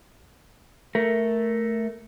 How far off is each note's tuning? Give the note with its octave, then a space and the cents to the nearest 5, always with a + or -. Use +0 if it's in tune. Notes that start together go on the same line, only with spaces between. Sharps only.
A3 +0 A#4 +0